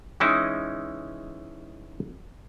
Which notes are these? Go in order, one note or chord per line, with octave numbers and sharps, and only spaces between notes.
E3 G#3 C#4 D#4 E4